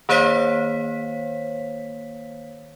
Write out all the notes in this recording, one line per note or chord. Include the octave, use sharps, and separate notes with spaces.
D#3 A#3 C5 C#5 F5 B6